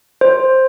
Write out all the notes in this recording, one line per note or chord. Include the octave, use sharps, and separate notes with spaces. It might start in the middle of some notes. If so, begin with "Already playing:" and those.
C5